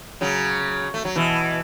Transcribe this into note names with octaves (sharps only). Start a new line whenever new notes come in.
C#3 F#3
A3
F#3
B2 E3